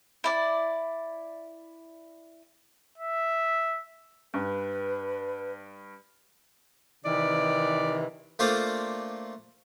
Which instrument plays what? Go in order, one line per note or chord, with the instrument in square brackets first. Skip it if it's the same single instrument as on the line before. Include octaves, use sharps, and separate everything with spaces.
[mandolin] E4 D5
[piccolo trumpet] E5
[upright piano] G2 [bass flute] B4
[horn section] C3 D#3 E3 [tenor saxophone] D5
[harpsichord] A3 A#3 D4 F4 C5